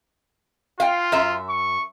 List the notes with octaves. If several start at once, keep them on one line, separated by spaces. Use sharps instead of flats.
F4 F5 G5
F#2 E5
C#6